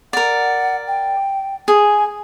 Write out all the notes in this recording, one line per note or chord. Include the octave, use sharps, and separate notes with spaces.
A#4 D5 F#5
G5
G#4 G#5